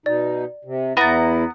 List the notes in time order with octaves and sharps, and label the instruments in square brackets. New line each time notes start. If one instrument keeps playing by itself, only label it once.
[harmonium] B2 D#4 [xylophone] D5
[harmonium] C3
[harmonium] E2 E4 [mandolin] B3 A#5 [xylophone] B5 A6